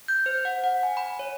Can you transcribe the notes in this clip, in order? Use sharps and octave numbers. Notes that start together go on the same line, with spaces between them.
G6
C5
F#5
F#5
G#5
B5
C#5